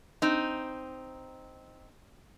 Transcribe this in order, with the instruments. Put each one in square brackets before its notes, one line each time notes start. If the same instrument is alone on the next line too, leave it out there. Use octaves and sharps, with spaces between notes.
[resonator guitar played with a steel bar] C4 D#4